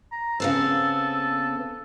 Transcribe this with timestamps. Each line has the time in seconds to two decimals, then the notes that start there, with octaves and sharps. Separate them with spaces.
0.12 A#5
0.40 C#3 B3 C4 A4